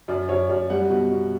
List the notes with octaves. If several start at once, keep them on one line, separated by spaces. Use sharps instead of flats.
F#2 D5
F#2 C#5
F#2 D5
G3 F#5
B2
B2